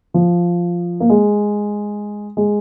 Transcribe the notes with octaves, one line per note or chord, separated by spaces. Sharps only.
F3
A#3
G#3
G#3